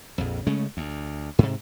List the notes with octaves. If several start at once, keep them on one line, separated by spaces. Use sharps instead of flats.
A#1 F2
C#3 G#3 A3 C#4
D2
G#2 C3